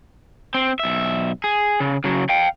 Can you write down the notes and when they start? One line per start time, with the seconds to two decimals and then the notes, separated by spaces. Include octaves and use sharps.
0.55 C4
0.80 B1 E5
1.44 G#4
1.80 C#3
2.04 C#3 F#3
2.29 F5 G5